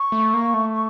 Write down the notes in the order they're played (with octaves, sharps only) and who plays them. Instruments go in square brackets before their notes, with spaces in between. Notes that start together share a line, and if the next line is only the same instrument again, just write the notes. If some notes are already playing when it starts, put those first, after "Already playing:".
Already playing: [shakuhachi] C#6
[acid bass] A3
A#3
A3
[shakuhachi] C#6